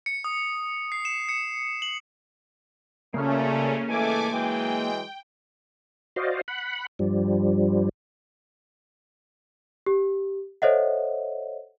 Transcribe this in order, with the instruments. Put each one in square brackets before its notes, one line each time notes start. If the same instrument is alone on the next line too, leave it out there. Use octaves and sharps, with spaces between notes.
[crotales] C#7
D#6
C7
E7
C#7
F#7
[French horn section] A#2 G3 A3 [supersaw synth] C#3 C#4 [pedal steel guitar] A#3 F6
[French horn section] E3 G#3 A3 [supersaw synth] G#5 D6
[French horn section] E3 F#3 G#3 [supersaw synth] G5
[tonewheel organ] F#4 C5 D5 D#5 F5
F#5 B5
G2 F3 G3
[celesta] G4
A4 C5 C#5 D#5 E5 F#5